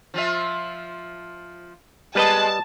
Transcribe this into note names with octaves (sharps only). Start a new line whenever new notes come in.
F3 F4 E5
G3 G#3 A#3 B3 B4 D#5 A5